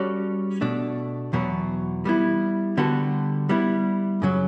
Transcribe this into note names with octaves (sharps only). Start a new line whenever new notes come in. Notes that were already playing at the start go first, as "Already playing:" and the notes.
Already playing: G3 C#4 F#4 A4 D5
B2 A3 D4
E2 B2 F#3 B3
G3 B3 E4
D3 G3 B3 F#4 A4
G3 B3 E4
F#2 C#3 F#3